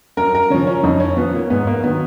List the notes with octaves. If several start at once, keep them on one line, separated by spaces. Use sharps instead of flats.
F#2 A#4
A#4
C#3 F3 C#4
C#4
F2 D#4
C#4
F3 B3
A#3
G#2 B3
A#3
D#3 F#3 B3